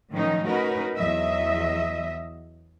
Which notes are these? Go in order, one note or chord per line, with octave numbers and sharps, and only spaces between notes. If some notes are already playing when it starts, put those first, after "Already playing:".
A2 D#3 F3 F#3 C#4 D#4
C#4 D#4 F#4 A#4 B4
E2 F#3 D#5 E5